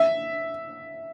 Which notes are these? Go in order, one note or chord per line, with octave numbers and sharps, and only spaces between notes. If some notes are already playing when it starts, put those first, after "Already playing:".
Already playing: E5